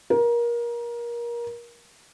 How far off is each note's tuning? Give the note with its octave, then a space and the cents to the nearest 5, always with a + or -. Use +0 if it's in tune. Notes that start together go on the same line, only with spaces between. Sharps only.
A#4 +25